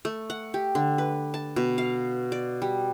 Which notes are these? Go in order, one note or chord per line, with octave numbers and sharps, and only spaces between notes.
A3
F#5
G4
D3
B4
A5
B2
F5
D5
G3